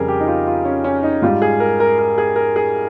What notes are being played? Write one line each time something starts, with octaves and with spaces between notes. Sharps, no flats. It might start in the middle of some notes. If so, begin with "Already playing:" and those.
Already playing: F2 C#3 G3 G#4 A#4
G4
D#4
F4
F4
C#4
C#4
D#4
G#2 G3 F4
G#4
A#4
A#4
A#4
G#4
A#4
G#4